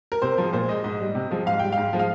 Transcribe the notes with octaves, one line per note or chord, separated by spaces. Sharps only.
A#4
C3 C5
F3 G#3
A#2 C5
G#3 D#5
G#2 D#5
G3
C3
F3 G#3
G#2 F5
G3 G5
G#2 F5
F3 G#3
F5